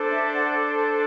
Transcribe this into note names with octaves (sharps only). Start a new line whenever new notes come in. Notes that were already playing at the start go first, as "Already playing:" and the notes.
Already playing: D4 A4 C5
E5
D5 F#5